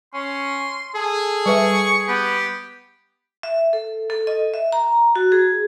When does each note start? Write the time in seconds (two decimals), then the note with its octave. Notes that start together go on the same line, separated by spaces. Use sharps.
0.14 C#4 C6
0.96 G#4 A4
1.46 G3 B4 E5 C#6
2.08 B3 G4
3.43 E5
3.73 A4
4.10 A4
4.27 D#5
4.54 E5
4.72 A#5
5.16 F#4
5.32 G#4